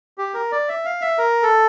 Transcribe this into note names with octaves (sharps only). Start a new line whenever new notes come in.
G4
A#4
D5
E5
F5
E5
A#4
A4